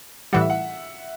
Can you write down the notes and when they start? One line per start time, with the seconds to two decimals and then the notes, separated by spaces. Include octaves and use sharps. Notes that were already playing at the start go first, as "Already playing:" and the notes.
0.33 A2 E3 G3 F#5
0.41 E5
0.50 F#5